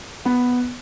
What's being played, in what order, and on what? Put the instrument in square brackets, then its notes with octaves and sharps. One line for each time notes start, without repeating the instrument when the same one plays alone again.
[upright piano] B3